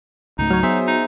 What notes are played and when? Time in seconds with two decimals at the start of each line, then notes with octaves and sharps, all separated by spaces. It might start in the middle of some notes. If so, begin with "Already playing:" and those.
0.39 C#2 G#2 A3 D#4
0.50 F#3 C#5 F6
0.63 B3 G#4 C5 E5
0.87 D#4